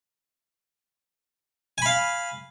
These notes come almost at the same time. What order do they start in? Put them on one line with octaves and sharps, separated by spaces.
G#5 B5 F5